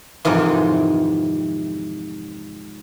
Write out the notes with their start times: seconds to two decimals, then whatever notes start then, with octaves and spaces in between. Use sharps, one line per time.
0.25 F2 G#2 C3 D#3 E3